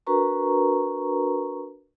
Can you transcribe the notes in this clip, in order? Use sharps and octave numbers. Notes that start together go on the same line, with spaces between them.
D4 F#4 A#4 B4 A#5 C#6